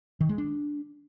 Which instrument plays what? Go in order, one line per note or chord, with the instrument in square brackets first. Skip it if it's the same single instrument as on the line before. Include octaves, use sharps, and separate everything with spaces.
[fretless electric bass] D#3
G#3
D4